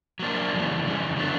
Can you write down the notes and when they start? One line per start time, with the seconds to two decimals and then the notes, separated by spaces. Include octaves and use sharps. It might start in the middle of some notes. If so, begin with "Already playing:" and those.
0.19 F#3 A#3 D4
0.52 F2 C#3 E3 G3
0.83 F2 C#3 E3 G3
1.16 D3 F#3 B3 D4